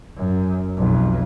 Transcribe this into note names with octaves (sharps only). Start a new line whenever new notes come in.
F#2
B1 F2